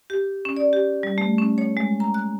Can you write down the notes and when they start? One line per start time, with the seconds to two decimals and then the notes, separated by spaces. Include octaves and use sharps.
0.10 G4
0.45 C#4
0.57 D5
0.73 G4
1.03 G3
1.18 A3
1.38 C#4
1.58 C#5
1.77 G#3
2.00 A#5
2.14 F#6